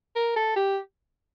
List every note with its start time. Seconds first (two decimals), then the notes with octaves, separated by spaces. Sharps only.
0.16 A#4
0.36 A4
0.56 G4